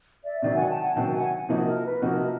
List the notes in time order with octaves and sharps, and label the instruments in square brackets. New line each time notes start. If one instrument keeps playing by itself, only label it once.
[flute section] D5 E5
[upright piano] C3 D#3 F#3 [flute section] D5 E5
[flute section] F#5 G#5
G5 A5
F#5 G#5
[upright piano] C3 D#3 F#3 [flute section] G5 A5
[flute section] F#5 G#5
[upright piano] C3 F3 A#3 D#4 F#4
[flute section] A#4
B4
[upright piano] C3 F3 A#3 D#4 F#4 [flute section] A#4